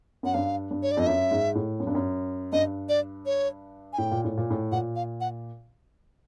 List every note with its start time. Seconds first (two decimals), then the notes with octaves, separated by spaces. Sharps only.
0.23 F#2 F#5
0.34 G2 F5
0.71 G2
0.83 C#5
0.91 D5
0.97 F2 D#5
1.07 F#2 E5
1.31 G#2
1.55 A2
1.80 F#2
1.87 G2
1.95 F#2
2.52 G2 D#5
2.89 D5
3.26 C#5
3.93 G#5
3.98 A2 G5
4.11 A#2
4.24 A2
4.37 A#2
4.50 A2
4.72 A#2 F#5
4.96 F5
5.21 F#5